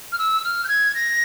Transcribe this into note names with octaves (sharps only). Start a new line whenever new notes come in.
F6
E6
F6
G6
G#6
A#6